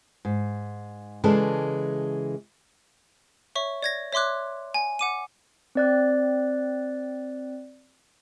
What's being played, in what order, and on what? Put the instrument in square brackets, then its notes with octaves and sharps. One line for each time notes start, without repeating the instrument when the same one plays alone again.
[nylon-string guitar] G#2
C#3 E3 G#3 A4 D5 A5
[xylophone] C#5 E5 C#6
D5 G#6 A#6
C#5 E5 C6 D6 F#6
G#5
F#5 D6 D#7
[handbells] C4 D5 F#6